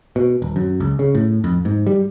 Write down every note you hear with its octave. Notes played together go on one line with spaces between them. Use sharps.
B2
D#1
F#2
C#2
C#3
A2
F2
G#2
G3